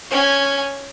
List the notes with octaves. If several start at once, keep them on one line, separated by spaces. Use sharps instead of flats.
C#4 G#5